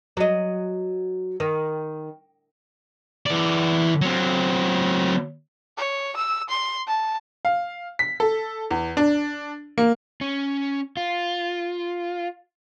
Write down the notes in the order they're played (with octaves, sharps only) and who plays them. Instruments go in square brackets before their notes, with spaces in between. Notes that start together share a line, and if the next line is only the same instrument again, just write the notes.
[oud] F#3 D#5
D#3
[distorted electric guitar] E3 D5
F#3 C4
[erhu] C#5
E6
C6
A5
[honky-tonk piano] F5
B6
A4
E2
D4
A#3
[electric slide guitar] C#4
F4